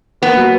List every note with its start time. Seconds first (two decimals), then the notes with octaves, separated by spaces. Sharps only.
0.22 A#3 B3
0.37 F#3